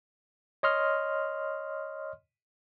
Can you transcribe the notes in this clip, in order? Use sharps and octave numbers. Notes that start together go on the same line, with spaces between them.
C#5 D#5 C6 F6